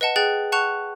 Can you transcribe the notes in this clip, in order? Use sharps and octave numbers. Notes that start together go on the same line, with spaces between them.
B4 D#5 F#5 A5
G#4 G5 F#6 A6
F#5 A5 C#6 F#6 F7